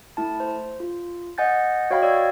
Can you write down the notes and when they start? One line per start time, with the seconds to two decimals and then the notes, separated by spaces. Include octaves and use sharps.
0.17 A3 E4 A5
0.40 C5
0.80 F4
1.38 D#5 F#5 G#5 G6 A6
1.90 F#4 C#5 D#5 F5 G5 B5
2.02 D5 E6 G#6